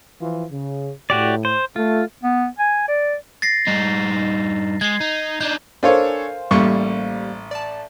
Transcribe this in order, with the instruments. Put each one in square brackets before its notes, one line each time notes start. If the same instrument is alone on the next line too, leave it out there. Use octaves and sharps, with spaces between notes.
[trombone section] E3 F3 F4
C#3
[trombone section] A2 [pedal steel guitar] F#4 G4 D5
[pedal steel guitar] C5
[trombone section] A3 [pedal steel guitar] F4
[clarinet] B3
G#5
D5
[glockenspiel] A6 A#6 C7
[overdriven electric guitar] G2 D#4
[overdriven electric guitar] G#3 [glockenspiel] G#6 C7
[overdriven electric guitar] D#4
[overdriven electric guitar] D4 D#4 [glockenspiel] G6
[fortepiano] D4 A4 C#5 [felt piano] A#4 C5 F5 [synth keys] G#5
[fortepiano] A1 C#6 [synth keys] G3 A#3 G4
[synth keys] D5 A5